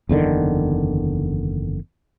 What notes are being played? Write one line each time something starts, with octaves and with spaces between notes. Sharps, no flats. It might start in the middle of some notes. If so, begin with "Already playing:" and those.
F#1 E2 D3 D#3